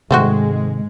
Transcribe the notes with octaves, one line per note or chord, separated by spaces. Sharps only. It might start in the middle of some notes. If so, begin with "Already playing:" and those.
G#2 C3 D#3 G#3 A3 C4 F#4